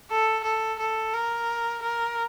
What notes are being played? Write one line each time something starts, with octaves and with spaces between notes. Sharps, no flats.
A4
A4
A4
A#4
A#4